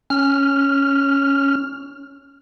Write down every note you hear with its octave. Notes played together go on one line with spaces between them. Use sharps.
C#4 F6